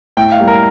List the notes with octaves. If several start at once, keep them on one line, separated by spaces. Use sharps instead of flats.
A2 G5
F5
G3 A#3
A#4